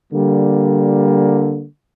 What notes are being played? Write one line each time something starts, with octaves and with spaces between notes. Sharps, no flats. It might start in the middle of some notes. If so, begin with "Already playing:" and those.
D3 G3 A#3